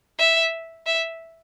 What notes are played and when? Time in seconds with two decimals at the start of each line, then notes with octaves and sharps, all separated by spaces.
0.19 E5
0.86 E5